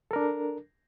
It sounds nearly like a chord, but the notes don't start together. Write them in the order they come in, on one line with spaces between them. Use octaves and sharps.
A4 A#4 D4